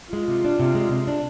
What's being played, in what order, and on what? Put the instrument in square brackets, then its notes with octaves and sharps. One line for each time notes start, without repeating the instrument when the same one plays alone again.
[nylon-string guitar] G#3 [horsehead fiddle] F4
[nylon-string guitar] C3
D4
C3
G#3
C3
D4